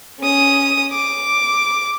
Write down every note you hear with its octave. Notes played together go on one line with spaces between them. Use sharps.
C#4 D#6
D6